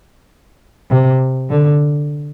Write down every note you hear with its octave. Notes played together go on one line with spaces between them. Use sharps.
C3
D3